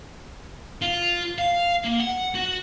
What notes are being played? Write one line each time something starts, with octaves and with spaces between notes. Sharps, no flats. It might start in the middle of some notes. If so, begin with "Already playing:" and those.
F4
F5
A#3
F#5
F#4